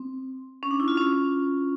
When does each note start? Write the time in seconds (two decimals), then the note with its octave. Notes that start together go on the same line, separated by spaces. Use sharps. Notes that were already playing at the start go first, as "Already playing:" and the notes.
Already playing: C4
0.63 C#4
0.71 D4
0.80 E4
0.88 F4
0.97 C#4